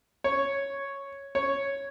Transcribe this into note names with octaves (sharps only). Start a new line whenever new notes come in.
C#5
C#5